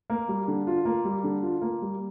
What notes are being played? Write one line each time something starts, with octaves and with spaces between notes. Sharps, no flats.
A#3
G3
D3
F4
A#3
G3
D3
F4
A#3
G3